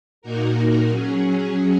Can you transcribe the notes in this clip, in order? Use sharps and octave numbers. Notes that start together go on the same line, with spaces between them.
A#2 A#3 D#4 F#4 A#4
F#3 C#4 G#4